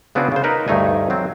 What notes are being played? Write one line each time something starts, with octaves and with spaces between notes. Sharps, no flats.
C#3 B3 C4 D4 F#4 G#4
C#3 C5
D#4 A#4 B4 A#5
D2 G2 A3 D#4 G#5
F#3 C4